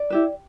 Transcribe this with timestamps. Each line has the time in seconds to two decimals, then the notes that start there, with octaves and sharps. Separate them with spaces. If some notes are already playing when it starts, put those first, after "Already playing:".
Already playing: D5
0.10 E4 G4 B4